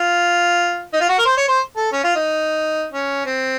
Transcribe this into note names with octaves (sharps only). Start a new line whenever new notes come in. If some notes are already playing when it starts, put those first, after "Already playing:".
Already playing: F4
D#4
F4
F#4
A#4
C5
C#5
C5
A4
C#4
F4
D#4
C#4
C4